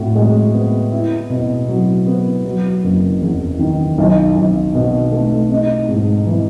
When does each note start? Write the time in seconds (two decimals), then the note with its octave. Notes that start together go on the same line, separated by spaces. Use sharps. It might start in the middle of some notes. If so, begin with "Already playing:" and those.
Already playing: A2 F#4
0.15 G#3
0.54 B3
0.92 E4
1.30 B2
1.68 F#3
2.07 B3
2.45 F#3
2.83 F#1
3.21 E2
3.59 D#3
3.98 B1
4.36 B1
4.74 B2
5.12 A3
5.51 D#4
5.88 G#2
6.27 E3